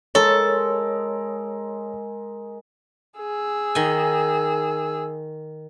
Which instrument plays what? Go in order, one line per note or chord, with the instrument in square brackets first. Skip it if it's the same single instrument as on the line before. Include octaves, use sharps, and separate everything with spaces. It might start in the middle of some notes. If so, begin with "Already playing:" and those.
[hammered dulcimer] G#3 A#4 [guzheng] A4 [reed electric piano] C#5
[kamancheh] G#4 E6
[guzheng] D#3 G#5